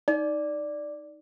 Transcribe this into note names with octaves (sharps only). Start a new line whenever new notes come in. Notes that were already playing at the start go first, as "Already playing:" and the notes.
D#4 D5